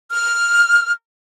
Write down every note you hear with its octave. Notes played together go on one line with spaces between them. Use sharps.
F6